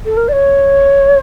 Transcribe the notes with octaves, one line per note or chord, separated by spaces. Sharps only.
A4
A#4
D5
C#5